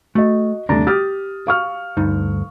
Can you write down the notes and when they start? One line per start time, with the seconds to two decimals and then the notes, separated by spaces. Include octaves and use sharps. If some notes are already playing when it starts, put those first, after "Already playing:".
0.15 A3 F#4 D#5
0.69 D#2 C3 G3 A3 D4 A#5
0.87 G4 D#6 F6 A6
1.47 F5 C#6 F6
1.97 D2 G2 D#4